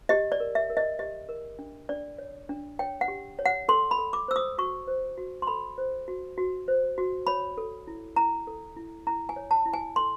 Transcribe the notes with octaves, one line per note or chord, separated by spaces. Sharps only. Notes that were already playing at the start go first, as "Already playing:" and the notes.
G4 D#5
D5
A#4
E5
A#4
D#5
G4 D#5
A#4
D4
D4 D5
C#5
D4
C#5 G5
F#5
G4
C#5
F#5
A4 C6
B5
A4
D6
C5 E6
D#6
F#4 C#6
C5
F#4
C6
A4 B5
C5
F#4
F#4
C5
F#4
C#5 B5
A4
E4
E4 A#5
A4
E4
E4 A#5
G#5
C#5
A5
E4
G#5
A4 C6